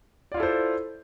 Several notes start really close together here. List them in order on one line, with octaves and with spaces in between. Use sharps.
D5 F4 E4 A4 C5